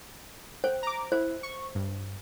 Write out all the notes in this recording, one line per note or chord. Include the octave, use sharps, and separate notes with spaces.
C5 G5
A#5 D6
E4 C5
C#6
G2